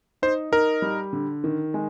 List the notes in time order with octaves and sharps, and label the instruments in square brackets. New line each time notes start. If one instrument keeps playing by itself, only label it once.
[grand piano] D#4 [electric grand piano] C5
[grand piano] D#4 [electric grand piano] A#4
[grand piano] G3
D3
D#3
G#3